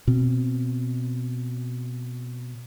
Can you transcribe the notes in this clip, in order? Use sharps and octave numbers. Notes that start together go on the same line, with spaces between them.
B2 C4